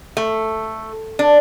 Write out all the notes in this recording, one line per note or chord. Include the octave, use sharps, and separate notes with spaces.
A3
D4